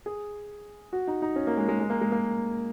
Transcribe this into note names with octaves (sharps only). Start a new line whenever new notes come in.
G#4
F#4
D#4
D#4
C#4
A#3
G#3
G#3
G#3
A#3
G#3
A#3